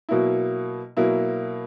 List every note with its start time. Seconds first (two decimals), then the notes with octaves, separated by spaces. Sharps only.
0.09 B2 F#3 A#3 E4
0.97 B2 F#3 A#3 E4